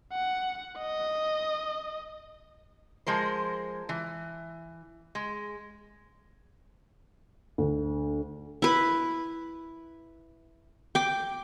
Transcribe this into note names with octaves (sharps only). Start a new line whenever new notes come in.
F#5
D#5
F3 G#3 A#4 C5
E3
G#3
D2
E4 B4
G5 D6